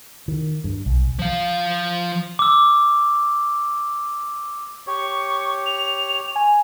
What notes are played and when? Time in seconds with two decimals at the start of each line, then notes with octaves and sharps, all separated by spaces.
0.28 D#3
0.64 G2
0.86 B1
1.19 F3 F5
2.39 D6 E6
4.87 G4 C#5 C#6
5.66 F7
6.36 G#5